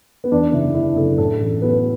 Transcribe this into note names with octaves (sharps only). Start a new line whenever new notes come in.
B3
E2 D4
F#1 E4
D3 E4
F#1 A4
A2 A4
A1
F#3 B3